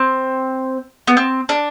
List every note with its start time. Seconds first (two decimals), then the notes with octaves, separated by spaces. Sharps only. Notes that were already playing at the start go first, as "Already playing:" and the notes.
Already playing: C4
1.07 B3
1.17 C4
1.49 D4